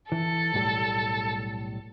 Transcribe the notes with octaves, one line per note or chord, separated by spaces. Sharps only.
E3 A4
B1 A2 G3